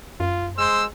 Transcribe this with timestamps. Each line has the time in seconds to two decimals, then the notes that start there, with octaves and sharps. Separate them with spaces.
0.20 F#2 F4
0.58 G#3 C5 E6